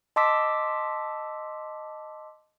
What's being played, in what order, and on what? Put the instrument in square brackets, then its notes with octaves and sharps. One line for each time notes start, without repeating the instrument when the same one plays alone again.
[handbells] D#5 A5 C6 D6 E6 B6